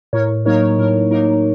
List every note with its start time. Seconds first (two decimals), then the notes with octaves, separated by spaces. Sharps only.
0.13 A2 A#4 C#5
0.45 F#3 A#3 D#4 A#4 C#5
0.78 A2 A#4
1.11 F#3 A#3 D#4 A#4